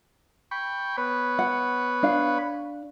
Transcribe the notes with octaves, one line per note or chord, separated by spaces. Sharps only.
G5 B5 C#6
B3 B4 C#5
F#5
D4 F5